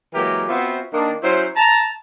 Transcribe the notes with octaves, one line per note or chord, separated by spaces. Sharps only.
E3 F#3 G#3 A#3 G4 A#4
B3 C4 F4 F#4 C5 E5
D#3 A#3 D4
F#3 C#4 E4 C5
A5 A#5